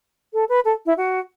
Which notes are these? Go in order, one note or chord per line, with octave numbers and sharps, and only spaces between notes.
A4
B4
A4
E4
F#4